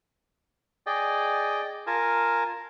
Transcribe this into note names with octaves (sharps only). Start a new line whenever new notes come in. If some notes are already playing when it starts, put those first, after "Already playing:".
G#4 D5 D#5 G5
F4 A#4 G#5 A5